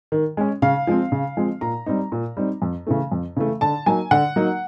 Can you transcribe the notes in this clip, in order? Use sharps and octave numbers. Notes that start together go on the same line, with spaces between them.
D#3
G#3 C#4
C#3 F5
F3 G#3 C4
C#3
F3 G#3 C4
A#2 A#5
G3 C4 D#4
A#2
G3 C4 D#4
F2
C#3 E3 A3
F2
C#3 E3 A3
D3 A5
F#3 A#3 D#4 G#5
D3 F#5
F#3 A#3 D#4